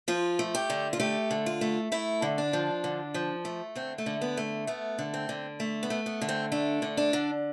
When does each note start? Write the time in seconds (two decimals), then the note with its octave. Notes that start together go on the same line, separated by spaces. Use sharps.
0.08 F3 F4
0.39 A3
0.55 G4
0.70 D3
0.93 F4
1.00 A3 G4
1.31 D3
1.46 F4
1.61 A3
1.92 A3 E4
2.22 D3
2.38 D4
2.53 F3
2.84 D3
3.14 F3
3.45 A3
3.75 D3 C4
3.98 A3
4.06 D3
4.21 B3
4.37 A3
4.67 A3 B3
4.99 D3
5.14 C4
5.29 D3
5.60 A3
5.83 B3
5.90 A3
6.06 B3
6.21 D3
6.29 C4
6.52 A3 D4
6.82 D3
6.97 D4
7.13 D3